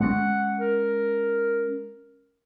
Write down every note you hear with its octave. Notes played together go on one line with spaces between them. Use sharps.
G#3 A#3 C#4 F#5
A#4